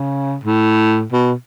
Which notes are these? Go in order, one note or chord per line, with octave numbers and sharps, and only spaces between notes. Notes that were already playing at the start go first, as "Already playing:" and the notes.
Already playing: C#3
A2
B2